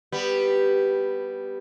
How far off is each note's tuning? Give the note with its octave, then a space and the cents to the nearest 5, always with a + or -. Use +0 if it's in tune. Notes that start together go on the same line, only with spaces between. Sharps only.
G3 +0 B3 +0